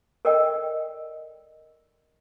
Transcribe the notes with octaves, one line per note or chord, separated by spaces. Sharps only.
A4 A#4 D5 D#5 G5